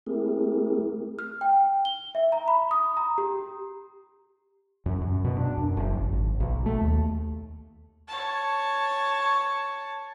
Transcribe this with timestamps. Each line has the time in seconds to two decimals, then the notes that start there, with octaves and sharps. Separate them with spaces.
0.06 A3 C4 E4 G4 G#4 A#4
1.19 F6
1.41 G5
1.85 G7
2.15 E5
2.32 A#5
2.48 B5
2.71 D#6
2.97 A#5
3.18 G4
4.86 F#2
5.01 F#2
5.24 B2
5.37 D4
5.57 F#2
5.77 F#1
5.98 G#1
6.13 G#1
6.40 B1
6.66 A3
6.81 D#2
8.08 C#5 A5